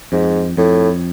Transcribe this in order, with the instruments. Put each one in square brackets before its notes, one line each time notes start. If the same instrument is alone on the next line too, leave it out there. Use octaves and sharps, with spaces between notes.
[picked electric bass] F2 [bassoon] G#2
[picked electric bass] F2 [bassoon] A2